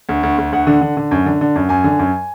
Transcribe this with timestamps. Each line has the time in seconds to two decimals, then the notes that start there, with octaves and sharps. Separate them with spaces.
0.09 D2
0.23 D2
0.38 D2
0.52 D2 F#5
0.67 D3
0.81 D3
0.97 D3
1.11 F#2
1.26 D3
1.41 D3
1.56 F#2
1.69 F#2 G#5
1.84 D3
1.99 F#2